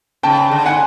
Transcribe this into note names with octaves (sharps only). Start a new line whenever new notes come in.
C#3 G5 A5
D3
F#5 G#5